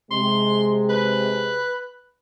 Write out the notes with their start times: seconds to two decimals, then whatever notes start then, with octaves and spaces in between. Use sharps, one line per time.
0.11 C3 G#3 C6
0.89 B4